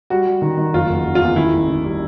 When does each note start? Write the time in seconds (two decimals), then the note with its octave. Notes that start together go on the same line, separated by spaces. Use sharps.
0.10 G3 F#4
0.26 G3
0.42 D#3
0.58 D#3
0.74 F#1 F4
0.89 F#1
1.05 F#1
1.15 F4
1.22 E2
1.36 D#3 E4
1.53 A1
1.68 D#3
1.84 G3